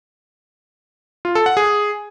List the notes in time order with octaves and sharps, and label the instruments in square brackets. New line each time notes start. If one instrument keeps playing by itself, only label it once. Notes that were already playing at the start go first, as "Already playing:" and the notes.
[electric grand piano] F4
A4
F#5
G#4